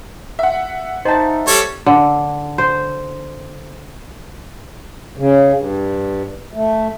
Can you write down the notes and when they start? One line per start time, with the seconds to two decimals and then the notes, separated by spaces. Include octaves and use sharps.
0.39 E5 F#5
1.05 D#4 C5 A5
1.48 G3 A4 C#5
1.86 D3
2.58 C5
5.18 C#3
5.54 G2
6.53 A3